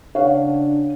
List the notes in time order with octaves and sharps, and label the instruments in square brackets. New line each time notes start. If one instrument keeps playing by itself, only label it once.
[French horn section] C#3 D4 [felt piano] C#5 F5 F#5